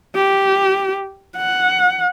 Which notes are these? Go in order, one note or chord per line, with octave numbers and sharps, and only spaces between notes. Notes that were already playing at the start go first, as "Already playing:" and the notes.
G4
F#5